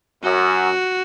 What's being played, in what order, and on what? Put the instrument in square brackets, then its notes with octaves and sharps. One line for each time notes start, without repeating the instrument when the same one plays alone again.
[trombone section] F#2 [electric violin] F#4